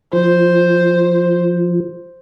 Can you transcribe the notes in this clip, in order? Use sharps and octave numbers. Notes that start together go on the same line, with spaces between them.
F3 C5